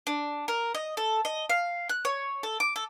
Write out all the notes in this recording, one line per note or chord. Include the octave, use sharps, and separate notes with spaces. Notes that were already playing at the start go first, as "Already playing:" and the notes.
D4
A#4
D#5
A4
D#5
F5
F#6
C#5
A4
D6
A4